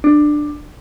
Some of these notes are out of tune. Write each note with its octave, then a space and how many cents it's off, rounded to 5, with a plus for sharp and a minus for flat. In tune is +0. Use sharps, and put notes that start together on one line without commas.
D4 +15